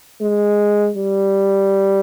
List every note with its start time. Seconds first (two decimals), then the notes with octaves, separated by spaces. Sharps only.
0.21 G#3
0.97 G3